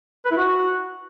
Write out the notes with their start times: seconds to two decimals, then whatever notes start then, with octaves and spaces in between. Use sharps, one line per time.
0.25 B4
0.31 E4
0.37 F#4